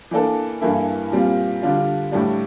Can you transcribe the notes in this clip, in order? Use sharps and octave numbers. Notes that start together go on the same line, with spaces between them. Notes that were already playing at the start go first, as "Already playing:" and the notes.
E3 A#3 D4 A4
G2 E3 A#3 E4 A4
A#2 G3 C4 F4
D3 G3 D4 F4
A2 G3 D4